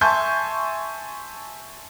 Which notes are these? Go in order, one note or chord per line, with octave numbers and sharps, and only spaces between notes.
E5 G#5 A5 C6 C#6 G6